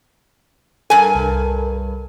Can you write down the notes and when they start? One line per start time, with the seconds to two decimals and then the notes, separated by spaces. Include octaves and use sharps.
0.90 G2 A4 A#4 G#5
1.15 C2